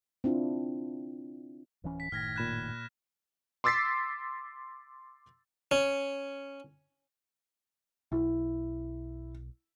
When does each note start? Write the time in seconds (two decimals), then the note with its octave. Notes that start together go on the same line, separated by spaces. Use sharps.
0.24 C4 D4 E4 F4
1.84 D1 E3 C#4
2.00 B6
2.12 F#1 A2 D#3 F6 G#6 A#6
2.36 A#2 B5 F#6 G#6 E7
3.64 C6 D6 E6 A6 B6 C7
5.71 C#4
8.12 B1 E4